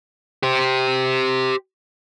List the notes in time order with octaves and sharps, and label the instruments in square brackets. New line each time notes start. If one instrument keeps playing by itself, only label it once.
[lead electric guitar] G4 C5